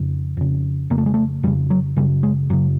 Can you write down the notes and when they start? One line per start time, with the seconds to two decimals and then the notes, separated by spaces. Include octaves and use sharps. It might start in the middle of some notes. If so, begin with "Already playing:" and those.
Already playing: F2 C#3
0.37 F2 C#3
0.90 F2 C#3 A#3
0.98 A3
1.06 G#3
1.14 A3
1.43 F2 G3
1.47 C#3
1.70 F#3
1.96 F#2 C#3 G3
2.23 G#3
2.50 F#2 C#3 F#3